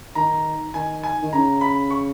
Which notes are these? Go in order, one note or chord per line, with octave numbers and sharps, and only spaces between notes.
D#3 A#5
D#3 G#5
G#5
D#3
C#3 A#5
B5
C#6